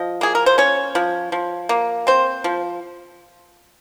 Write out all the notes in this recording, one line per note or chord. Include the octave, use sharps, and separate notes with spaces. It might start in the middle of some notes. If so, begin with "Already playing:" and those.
Already playing: F3 D#5
A#3 G#4
A#4
C5
C#4 C#5
F3
F3
A#3
C4 C5
F3